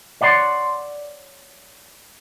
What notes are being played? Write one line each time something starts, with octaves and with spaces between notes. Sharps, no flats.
C#5 D5 F#5 A#5 C6